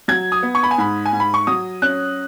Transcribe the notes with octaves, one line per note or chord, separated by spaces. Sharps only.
F#3 G#6
D#6
B3
C#6
B5
G#5
G#2 B5
G#5
G#2
B5
C#6
F#3 D#6
C#4 F#6